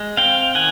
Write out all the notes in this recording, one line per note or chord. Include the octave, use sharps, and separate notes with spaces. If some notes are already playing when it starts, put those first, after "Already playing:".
Already playing: G#3
C4 F5 G5
D#3 F#5 G#5